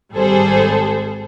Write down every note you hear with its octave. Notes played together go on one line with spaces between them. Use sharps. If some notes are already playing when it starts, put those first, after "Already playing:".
G#1 G3 G#4 A4 C5